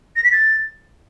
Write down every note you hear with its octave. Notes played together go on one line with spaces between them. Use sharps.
A#6
B6
A6